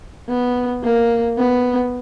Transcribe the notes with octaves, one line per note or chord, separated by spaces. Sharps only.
B3
A#3
B3